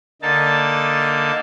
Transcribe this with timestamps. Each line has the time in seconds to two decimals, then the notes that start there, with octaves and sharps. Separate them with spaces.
0.22 D3 A#3 D#4 A5